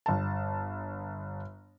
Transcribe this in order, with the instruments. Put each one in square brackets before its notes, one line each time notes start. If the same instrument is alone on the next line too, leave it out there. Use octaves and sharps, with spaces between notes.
[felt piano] G1 A5